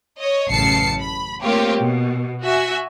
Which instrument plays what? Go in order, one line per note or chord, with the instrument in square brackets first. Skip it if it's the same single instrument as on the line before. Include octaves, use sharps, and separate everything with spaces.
[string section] C#5 D#5
A1 F#2 C#3 A5 C7 C#7
B5
A3 A#3 C4 F4 G4 C#5
B2
F#4 E5 G#5